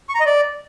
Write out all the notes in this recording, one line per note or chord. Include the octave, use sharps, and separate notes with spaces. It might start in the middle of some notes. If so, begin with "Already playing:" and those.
C#6
A#5
D#5
D5